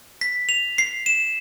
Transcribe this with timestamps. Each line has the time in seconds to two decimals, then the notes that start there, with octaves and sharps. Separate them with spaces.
0.21 B6
0.49 F7
0.78 C7
1.06 E7